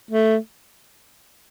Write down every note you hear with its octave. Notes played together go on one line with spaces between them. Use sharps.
A3